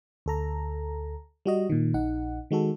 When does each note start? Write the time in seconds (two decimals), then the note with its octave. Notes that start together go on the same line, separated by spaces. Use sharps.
0.26 D2 A4 A#5
1.46 G3 F#4 D#5
1.70 A#2 D#3
1.94 A#1 D#4 F#5
2.51 D#3 G#3 F#4 A4